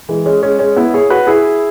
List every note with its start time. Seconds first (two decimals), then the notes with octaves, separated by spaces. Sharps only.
0.09 E3 G#3
0.26 G#3 C#4
0.43 G#3 C#4
0.59 G#3 C#4
0.76 B3 E4
0.94 G#4 C#5
1.10 F#4 B4
1.27 E4 G#4